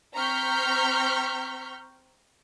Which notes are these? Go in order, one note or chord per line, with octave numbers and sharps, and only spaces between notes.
C4 A#5 C#6 F6 G6 B6